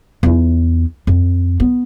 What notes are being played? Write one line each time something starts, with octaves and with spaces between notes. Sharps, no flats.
E2 D#4
F2
B3